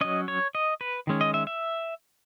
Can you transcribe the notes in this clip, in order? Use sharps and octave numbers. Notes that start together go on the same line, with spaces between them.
F#3 C#4 D#5
C#5
D#5
B4
D#3 G#3 C#4
D#5
E5
E5